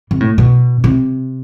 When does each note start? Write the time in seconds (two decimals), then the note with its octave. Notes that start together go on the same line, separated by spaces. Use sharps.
0.11 C3
0.20 A2
0.38 B2
0.84 C3